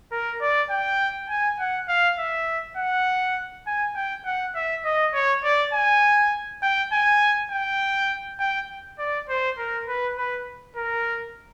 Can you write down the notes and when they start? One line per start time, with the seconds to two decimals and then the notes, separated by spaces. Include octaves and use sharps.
0.12 A#4
0.41 D5
0.70 G5
1.29 G#5
1.59 F#5
1.88 F5
2.19 E5
2.77 F#5
3.67 G#5
3.95 G5
4.25 F#5
4.55 E5
4.85 D#5
5.14 C#5
5.44 D5
5.74 G#5
6.62 G5
6.92 G#5
7.51 G5
8.39 G5
8.99 D5
9.29 C5
9.58 A#4
9.87 B4
10.18 B4
10.76 A#4